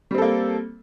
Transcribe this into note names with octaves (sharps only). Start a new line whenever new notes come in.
G3 A#3 C4 A4